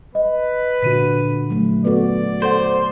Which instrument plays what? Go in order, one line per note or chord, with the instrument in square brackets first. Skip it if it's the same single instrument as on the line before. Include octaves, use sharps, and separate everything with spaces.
[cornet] B4 [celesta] D#5
[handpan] A#2 D3 F#4 [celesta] B6 D#7
[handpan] F#3 A3
[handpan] B3 F#4 [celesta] A4 B4 [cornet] D5
[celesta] A4 F#5 [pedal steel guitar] C5